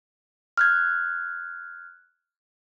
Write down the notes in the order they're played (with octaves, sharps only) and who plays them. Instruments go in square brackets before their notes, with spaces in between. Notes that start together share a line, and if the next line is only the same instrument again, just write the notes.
[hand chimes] F6 F#6 G#6